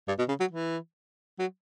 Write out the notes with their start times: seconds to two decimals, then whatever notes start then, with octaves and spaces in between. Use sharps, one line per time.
0.08 G2
0.19 B2
0.29 C#3
0.40 F#3
0.51 E3
1.39 F#3